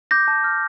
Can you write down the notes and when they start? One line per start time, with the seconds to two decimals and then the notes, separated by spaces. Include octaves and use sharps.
0.11 D6 G6 A#6
0.28 A5
0.44 F6